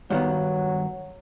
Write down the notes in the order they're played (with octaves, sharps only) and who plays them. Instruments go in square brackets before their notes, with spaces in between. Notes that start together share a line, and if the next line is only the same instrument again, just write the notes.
[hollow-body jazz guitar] G2 D#3 B3 [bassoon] F#3